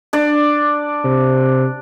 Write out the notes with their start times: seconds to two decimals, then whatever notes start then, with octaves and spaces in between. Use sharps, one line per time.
0.13 D4 D5
1.04 C3